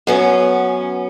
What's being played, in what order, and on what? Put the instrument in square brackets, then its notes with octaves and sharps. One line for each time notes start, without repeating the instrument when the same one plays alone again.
[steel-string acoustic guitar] F#2 B3 C#4